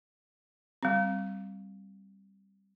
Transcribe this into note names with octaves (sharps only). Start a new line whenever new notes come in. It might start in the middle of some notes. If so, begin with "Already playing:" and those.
G3 C4